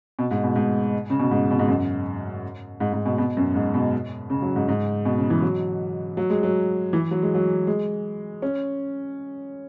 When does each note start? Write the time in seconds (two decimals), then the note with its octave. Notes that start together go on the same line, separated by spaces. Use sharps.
0.19 B2
0.31 G#2
0.44 B2
0.56 G#2
1.10 C#3
1.19 B2
1.31 G#2
1.51 B2
1.59 G#2
1.68 F#2
2.80 G#2
2.93 G#2
3.06 B2
3.18 B2
3.37 F#2
3.55 G#2
3.74 B2
4.30 C#3
4.42 F#3
4.56 G#2
4.68 G#2
5.05 B2
5.18 C#3
5.30 E3
5.42 F#3
6.17 F#3
6.30 G#3
6.43 F#3
6.93 E3
7.11 F#3
7.22 G#3
7.35 F#3
7.67 G#3
8.42 C#4